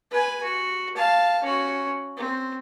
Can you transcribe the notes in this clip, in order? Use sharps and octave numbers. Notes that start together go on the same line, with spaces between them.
B4 G#5
F#4
F5 A5
C#4 F#4
C4